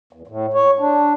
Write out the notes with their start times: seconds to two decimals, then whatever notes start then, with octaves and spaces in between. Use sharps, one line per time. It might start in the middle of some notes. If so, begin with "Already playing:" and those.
0.13 E2
0.27 A2
0.53 C#5
0.79 D4